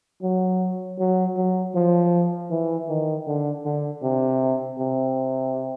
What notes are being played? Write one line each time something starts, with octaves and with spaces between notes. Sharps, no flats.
F#3
F#3
F#3
F3
E3
D#3
D3
D3
C3
C3